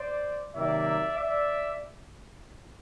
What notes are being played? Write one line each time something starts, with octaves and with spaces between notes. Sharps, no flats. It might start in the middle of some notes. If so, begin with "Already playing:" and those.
Already playing: C5 D5
C3 D#3 F#3 A#3 D5 E5
D5 E5